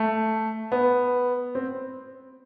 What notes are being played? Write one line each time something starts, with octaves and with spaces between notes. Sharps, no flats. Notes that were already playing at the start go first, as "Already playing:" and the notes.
Already playing: A3
B3
C4